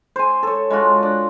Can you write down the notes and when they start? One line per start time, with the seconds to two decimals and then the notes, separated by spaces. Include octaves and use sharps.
0.16 C5 G#5
0.43 A4 C#5
0.70 G#3 F4 F#4
1.03 D4